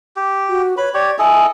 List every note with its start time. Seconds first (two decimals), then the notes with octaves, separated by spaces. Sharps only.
0.16 G4
0.49 F#4
0.77 B4 C#5 B5
0.94 G4 C#5 D5
1.19 E4 A4 D#5 G#5